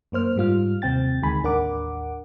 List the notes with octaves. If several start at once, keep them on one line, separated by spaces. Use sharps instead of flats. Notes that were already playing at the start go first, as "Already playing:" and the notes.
F#2 A#3 C5 F6
G#2 G3 F4 F6
D#2 C3 C4 G5 A6
D2 D#3 G#3 G#5 B5
A1 D#2 D4 A#4 F#5 D6